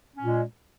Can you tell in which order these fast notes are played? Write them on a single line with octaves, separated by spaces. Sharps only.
C#4 A#2 G#3